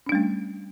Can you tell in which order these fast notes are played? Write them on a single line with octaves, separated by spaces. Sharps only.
C#4 D4 G3 A3